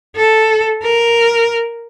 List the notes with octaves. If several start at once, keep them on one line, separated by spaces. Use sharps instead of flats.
A4
A#4